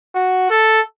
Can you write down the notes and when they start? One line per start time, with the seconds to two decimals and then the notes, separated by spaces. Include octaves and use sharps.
0.15 F#4
0.50 A4